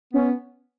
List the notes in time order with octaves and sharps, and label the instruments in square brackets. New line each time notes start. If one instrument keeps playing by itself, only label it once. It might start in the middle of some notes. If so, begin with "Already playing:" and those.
[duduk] B3 [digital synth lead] C#4